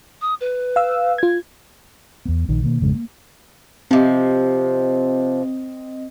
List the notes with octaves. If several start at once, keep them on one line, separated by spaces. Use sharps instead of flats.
D#6
B4
F5 E6
F4 G#6
E2 B3
A#1 D#3
B2 D#3 A3 A#3
G#1 F2 C#3 G#3
A#3
C3 F3 C4 D#5